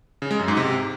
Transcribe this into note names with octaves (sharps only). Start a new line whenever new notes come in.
C#3
G#3
F#2
G#2
C3